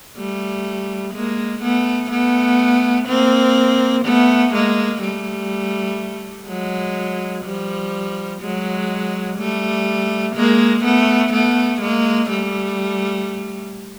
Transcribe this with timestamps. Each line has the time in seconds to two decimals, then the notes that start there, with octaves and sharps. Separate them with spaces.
0.17 G3 A3
1.14 G#3 A#3
1.62 A3 B3
2.11 A3 B3
3.08 A#3 C4
4.05 A3 B3
4.53 G#3 A#3
5.01 G3 A3
6.47 F#3 G#3
7.45 F3 G3
8.42 F#3 G#3
9.38 G3 A3
10.36 G#3 A#3
10.84 A3 B3
11.33 A3 B3
11.81 G#3 A#3
12.30 G3 A3